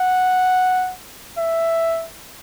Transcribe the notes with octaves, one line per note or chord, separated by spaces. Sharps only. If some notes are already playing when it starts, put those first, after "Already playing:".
Already playing: F#5
E5